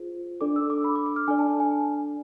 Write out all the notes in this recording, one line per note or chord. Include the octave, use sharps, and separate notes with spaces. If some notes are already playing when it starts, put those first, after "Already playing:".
Already playing: F4 G#4 C5
D4 A4 D5 D6
E6
D6
B5
D6
D6
F6
D4 A4 D5 G#5
A5
A5
G#5